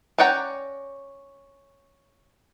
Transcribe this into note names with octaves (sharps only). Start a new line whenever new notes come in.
C#4 D5 F#5 G5 A#5